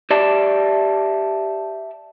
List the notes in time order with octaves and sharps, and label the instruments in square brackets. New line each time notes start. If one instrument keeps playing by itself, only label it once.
[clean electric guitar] G4 D5 E5 A5